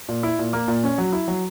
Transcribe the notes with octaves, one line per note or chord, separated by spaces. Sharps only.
A#2
E4
A#2
A#3
A#2
C#4
F#3
E4
F#3